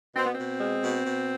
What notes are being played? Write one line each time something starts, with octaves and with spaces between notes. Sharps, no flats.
B2 C4
B3
B2 C4
G#3
B2
B2